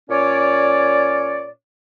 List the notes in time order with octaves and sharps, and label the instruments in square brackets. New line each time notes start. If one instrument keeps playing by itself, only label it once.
[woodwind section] A#2 C#4 C#5 D5